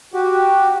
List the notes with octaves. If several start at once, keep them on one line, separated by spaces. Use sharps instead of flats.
F#4 G4